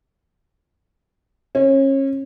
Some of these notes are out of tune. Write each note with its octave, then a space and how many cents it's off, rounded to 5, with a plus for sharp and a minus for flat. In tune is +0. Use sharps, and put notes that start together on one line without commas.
C#4 -30